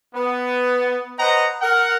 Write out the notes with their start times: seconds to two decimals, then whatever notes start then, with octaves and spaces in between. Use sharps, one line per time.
0.15 B3
1.19 B4 C5 D#5 F#5 A#5
1.62 A#4 F#5